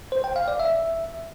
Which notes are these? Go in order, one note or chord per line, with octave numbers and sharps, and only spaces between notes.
C5
G5
F5
D5
E5